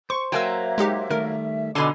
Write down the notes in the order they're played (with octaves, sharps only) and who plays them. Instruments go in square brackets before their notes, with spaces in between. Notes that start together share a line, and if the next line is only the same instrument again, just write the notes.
[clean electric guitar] C5 [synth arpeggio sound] C#6
[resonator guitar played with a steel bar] F#3 A#3 [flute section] E5 [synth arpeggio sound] G5 G#5 E6
[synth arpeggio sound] G#3 D#4 G4
[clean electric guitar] D#3 G3 A3 [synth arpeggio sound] A#4
[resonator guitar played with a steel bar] B2 D3 [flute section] D#4 A4 D6 [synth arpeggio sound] G#5 C6